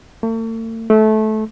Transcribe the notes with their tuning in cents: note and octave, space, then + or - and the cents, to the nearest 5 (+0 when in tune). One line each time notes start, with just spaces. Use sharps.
A3 +45
A3 -20